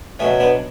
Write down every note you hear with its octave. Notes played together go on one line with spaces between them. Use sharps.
B2 F#3 A3 C#4
B3 D4